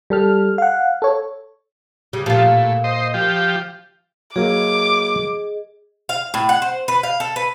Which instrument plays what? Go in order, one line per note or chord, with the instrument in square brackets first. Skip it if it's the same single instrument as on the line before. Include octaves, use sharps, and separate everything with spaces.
[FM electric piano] G3 A4 F6
F5 F#5
A4 C#5
[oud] C#3 G3
[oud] A#2 F4 [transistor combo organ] F3 A3
[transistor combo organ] A2
C5 D#5
F3 G4
[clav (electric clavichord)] F#3 A#3 [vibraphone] G#4 D#5 [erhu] D6
[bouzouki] F5
A2
F#5
C5
B4
F5
A4
B4